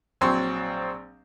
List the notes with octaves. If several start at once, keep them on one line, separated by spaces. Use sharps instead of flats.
A#1 F#3 C4 C6 C#6